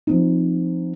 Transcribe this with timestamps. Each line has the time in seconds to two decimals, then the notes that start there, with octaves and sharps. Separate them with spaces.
0.07 F3 C4 D#4